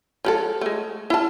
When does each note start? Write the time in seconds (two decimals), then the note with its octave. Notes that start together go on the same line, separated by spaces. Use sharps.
0.25 F3 G#3 A4
0.61 G#3 A3
1.10 E4 F4 A5